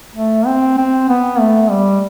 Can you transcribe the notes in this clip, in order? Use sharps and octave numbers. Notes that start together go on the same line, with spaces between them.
A3
C4
C4
B3
A3
G3